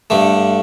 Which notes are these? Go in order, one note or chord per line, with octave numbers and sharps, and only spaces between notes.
G2 D3 A3